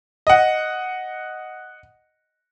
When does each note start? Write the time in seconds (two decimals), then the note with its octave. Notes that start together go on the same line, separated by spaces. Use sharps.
0.27 D#5 F#5